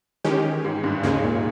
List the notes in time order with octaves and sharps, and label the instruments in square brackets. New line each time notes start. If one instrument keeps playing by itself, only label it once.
[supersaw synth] D#3 G#3 C#4 G4 [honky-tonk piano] E3
[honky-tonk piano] G#2
G2
[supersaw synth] D#2 C#3 G#3 [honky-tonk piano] G#2
[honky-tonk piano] A#2